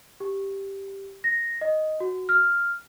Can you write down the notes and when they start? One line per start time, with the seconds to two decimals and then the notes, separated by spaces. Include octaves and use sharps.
0.20 G4
1.24 A#6
1.61 D#5
2.00 F#4
2.29 F6